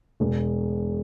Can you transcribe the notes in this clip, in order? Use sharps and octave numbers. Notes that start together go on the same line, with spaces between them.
E1